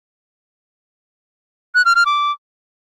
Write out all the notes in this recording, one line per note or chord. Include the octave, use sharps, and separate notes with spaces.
F#6
F6
F6
D6